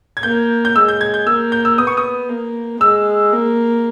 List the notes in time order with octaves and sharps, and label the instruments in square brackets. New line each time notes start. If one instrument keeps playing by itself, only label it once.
[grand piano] G#6
[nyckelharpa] A#3 [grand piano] G6
[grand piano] G6
[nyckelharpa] G#3 [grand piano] E6
[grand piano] G6
G#6
G6
[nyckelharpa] A#3 [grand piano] E6
[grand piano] G6
E6
[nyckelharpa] B3 [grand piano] D#6
[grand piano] C#6
D#6
[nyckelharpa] A#3
[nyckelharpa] G#3 [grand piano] E6
[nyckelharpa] A#3